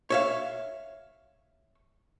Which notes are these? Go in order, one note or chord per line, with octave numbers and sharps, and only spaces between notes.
C#5 E5 F5